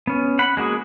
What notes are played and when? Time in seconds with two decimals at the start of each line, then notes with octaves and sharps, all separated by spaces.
0.07 B3 C#4
0.39 F#5 B5
0.57 G#3 A#3 F#4 G#4